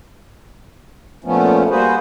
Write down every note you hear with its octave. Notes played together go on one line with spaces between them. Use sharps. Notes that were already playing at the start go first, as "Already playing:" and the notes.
A#2 F3 A3 B3 C#4
G3 A#3 F#4 G#4 B4 C5